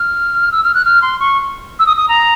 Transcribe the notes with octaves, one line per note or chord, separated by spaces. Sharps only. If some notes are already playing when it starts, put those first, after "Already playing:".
Already playing: F6
E6
F6
F#6
F6
C6
C#6
E6
D#6
D#6
A#5